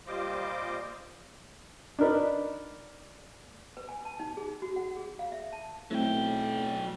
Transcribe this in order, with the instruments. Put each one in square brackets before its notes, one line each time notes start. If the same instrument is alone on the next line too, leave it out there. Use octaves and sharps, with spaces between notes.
[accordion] A#2 G3 F4 C5 D#5 D6
[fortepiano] D4 D#4 A#4 B4
[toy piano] B4
G#5
A5
D#4
G#4
F#4
F#5
G#4
F5
E5
A5
[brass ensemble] B1 [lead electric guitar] F#3 G5 [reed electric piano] A3 C4 E4